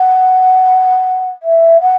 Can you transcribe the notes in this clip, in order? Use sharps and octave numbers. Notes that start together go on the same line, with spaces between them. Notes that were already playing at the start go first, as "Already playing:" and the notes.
Already playing: F#5
E5
F#5